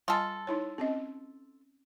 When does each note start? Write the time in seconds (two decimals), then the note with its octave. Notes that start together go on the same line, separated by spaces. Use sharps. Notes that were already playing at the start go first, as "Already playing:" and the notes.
0.08 G3 F4 A4 G#5 C6
0.47 D#4 E4 C#5
0.78 C4 C#4 D#5